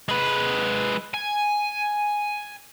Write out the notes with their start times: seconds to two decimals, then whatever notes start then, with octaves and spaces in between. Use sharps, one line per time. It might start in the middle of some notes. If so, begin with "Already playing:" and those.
0.09 G#3 B4
1.14 G#5